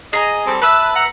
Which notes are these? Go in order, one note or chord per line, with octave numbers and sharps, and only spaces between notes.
G#4 D#5 A#5
G3 C4 A4
B4 E5 A5 B5
F#5 A#5